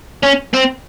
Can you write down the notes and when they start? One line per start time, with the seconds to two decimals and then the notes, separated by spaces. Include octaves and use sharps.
0.23 C#4
0.53 C4